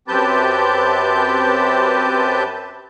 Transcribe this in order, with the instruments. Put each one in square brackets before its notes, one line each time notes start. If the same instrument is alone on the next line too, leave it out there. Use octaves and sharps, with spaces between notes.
[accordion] F#2 C4 G4 B4 A5 G6